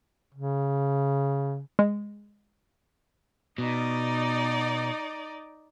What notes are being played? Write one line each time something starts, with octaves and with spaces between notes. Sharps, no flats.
C#3
G#3
B2 D#4 D5